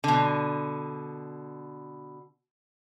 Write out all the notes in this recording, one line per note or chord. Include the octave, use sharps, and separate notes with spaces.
B2 D3